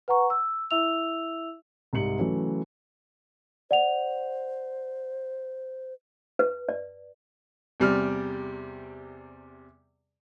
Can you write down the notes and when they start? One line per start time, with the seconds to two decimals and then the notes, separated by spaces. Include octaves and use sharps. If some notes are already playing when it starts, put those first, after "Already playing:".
0.08 B4 F#5 A#5 C#6
0.30 E6
0.71 E4 E5 E6 F7
1.93 C2 G#2 C3 C#7 F#7
2.19 C#3 E3 F#3 A3
3.71 C5 D5 F#5 F7
6.39 B4
6.69 D5
7.80 E2 C3 G3 D5 F6